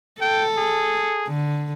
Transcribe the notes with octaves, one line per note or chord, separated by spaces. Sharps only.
A4 G5
G#4
D3